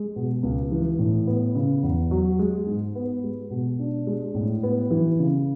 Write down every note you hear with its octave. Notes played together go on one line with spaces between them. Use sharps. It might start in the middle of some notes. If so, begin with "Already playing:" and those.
Already playing: G#3
B2
C#2
E3
A2
B3
C#3
E2
F#3
G#3
G#2
B3
G#3
B2
D4
G#3
A2
B3
E3
C#3